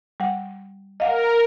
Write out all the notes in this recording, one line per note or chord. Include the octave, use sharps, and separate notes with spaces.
G3 F#5
A#4 D#5 F5 F#5